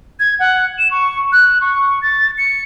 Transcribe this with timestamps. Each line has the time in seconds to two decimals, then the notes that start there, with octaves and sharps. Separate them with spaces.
0.20 G#6
0.39 F#5
0.78 E7
0.91 C#6
1.33 F#6
1.61 C#6
2.02 A6
2.38 C#7